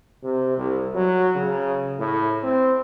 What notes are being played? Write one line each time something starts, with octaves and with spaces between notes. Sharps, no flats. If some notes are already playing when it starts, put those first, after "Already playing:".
C3
C2
F#3
C#3
A2
C4